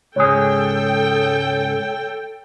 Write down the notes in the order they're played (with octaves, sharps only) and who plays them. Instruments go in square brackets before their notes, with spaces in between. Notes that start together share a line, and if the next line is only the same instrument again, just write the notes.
[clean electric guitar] C#2 G#2 G#4 [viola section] A4 G5 [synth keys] C#5